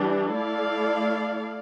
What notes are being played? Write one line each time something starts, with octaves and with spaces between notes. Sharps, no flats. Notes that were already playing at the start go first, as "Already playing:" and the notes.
Already playing: E3 G3 D4 G4
A3 E4 A4 D5 F5